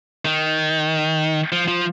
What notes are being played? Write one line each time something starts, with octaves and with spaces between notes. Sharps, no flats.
D#3
F3
F3